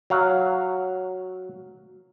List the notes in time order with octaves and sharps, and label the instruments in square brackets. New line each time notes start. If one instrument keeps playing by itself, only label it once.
[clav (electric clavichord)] F#3 F5 F#5